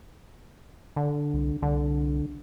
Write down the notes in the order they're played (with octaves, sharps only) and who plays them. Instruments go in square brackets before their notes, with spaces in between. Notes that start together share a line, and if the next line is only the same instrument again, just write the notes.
[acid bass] D3
[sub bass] C2
[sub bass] C2 [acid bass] D3